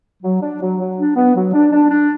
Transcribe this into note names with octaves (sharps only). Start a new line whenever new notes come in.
F#3
D4
F#3
F#3
D4
B3
F#3
D4
D4
D4